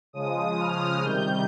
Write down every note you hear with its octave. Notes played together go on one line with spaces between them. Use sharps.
C#3 F3 G#3 D#6
F6
C3 D#3 G3 G6